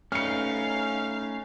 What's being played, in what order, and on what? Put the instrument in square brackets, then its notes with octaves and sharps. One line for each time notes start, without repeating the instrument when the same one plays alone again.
[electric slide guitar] A3 D#4 [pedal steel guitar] C#4 B4 [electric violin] F5 [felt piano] F6 C#7